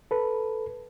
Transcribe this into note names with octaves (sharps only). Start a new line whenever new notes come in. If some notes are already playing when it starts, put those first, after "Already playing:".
A4 B4